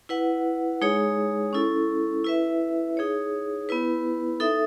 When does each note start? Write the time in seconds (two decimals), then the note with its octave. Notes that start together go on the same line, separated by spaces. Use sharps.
0.09 E4 B4 F#5
0.81 G#3 D#4 G#4 C#5
1.53 C#4 E4 A4
2.24 E4 B4 E5
2.97 D#4 G#4 C#5
3.69 B3 E4 B4
4.40 D#4 A4 E5